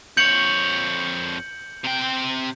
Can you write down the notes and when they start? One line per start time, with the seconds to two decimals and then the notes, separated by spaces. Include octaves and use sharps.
0.17 F2 C#5 G6 C#7 F#7
1.84 C3 G5